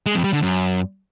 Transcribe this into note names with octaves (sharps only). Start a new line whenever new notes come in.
G#3
F2
G3
D3
F#2